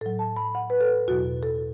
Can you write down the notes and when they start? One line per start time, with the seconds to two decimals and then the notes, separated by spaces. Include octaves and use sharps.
0.01 A2 F#3 A4
0.19 A5
0.36 B5
0.55 F#5
0.70 B4
0.81 A4
1.08 E2 B2 F#3 F#4
1.43 A4